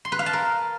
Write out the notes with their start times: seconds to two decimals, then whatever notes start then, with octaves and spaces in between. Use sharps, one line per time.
0.05 C6
0.12 B4
0.19 F5
0.26 A5
0.33 A#4